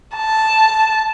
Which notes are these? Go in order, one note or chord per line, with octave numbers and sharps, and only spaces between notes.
A5